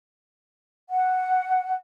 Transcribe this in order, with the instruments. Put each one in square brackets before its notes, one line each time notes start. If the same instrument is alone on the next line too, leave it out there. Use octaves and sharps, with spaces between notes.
[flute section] F#5